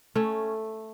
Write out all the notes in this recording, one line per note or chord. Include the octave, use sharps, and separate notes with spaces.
A3 C#4